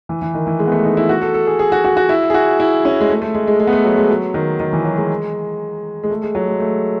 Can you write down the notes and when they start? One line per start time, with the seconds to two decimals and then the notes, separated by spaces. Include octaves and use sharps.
0.09 E3
0.22 E3
0.34 D#3
0.47 E3
0.59 G#3
0.67 B3
0.72 A3
0.85 D#4
0.97 E4
1.09 F#4
1.22 A4
1.34 A4
1.47 G#4
1.59 G#4
1.72 F#4
1.85 F#4
1.97 F#4
2.09 E4
2.30 G#4
2.34 F#4
2.60 E4
2.85 C#4
3.01 G#3
3.10 A3
3.22 A3
3.34 G#3
3.47 G#3
3.60 G#3
3.67 B3
3.73 A3
3.85 F#3
3.97 G#3
4.10 F#3
4.34 D#3
4.60 D#3
4.73 E3
4.85 F#3
4.97 G#3
6.04 G#3
6.10 A3
6.22 G#3
6.35 F#3
6.48 G#3
6.60 A3